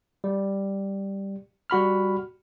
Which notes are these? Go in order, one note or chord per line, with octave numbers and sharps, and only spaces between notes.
G3
G3 F#4 B5 F6